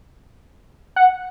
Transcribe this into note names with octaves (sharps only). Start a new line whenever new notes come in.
F#5